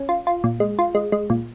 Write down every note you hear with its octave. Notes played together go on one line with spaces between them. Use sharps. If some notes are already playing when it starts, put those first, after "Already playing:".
Already playing: C#4
F4
F4
A#2
G#3
F4
G#3
G#3
A#2